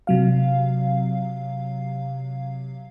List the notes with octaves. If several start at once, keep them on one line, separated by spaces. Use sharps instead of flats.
C3 F#3 F5